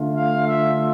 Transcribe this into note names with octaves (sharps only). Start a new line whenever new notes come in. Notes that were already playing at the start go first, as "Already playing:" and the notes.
Already playing: D3 A3 D4 F4
F5
E5